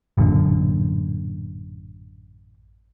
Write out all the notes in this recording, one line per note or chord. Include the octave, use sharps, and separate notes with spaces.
A1 F#2 A#2 D3